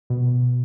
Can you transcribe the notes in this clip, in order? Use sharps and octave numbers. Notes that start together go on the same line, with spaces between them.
B2